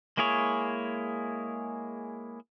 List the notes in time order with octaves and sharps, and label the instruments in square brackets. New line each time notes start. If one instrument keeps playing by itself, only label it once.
[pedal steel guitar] G#3 A#3 E4 G#4 C#5